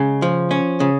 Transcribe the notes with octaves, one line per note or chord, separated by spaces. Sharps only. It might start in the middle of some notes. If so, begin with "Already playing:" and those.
Already playing: C#3 G#3
F3
C#4
C#3